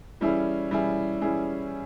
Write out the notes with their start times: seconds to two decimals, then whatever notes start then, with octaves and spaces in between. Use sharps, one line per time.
0.21 E3 G3 C#4 E4 G#4
0.70 E3 G3 C#4 E4 G#4
1.21 E3 G3 C#4 E4 G#4